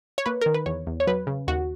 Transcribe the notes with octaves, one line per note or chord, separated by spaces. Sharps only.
C#5
A#3 B4
D#3 A#4
B4
E2 C#5
E2
C#5
F#3 B4
C#3
D#2 F#4